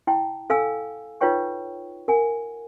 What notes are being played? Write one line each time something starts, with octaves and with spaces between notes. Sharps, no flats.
E4 G5 A5
A4 F5 G#5 E6
D#4 F4 B4 C#5 G5 C#6
A#4 F#5 G#5